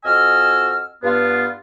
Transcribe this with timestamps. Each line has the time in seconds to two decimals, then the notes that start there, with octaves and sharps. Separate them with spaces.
0.04 F2 F#4 D#5 G#5 E6 F6
1.02 G2 B3 F4